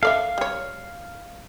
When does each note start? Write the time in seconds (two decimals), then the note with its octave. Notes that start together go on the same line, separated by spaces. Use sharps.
0.03 A4 D5 E5 F5
0.38 G3 C#5